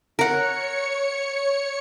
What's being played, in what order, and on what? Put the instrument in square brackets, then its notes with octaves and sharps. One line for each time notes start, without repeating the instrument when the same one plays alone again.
[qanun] A#4 F#5 [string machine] C#5 C#7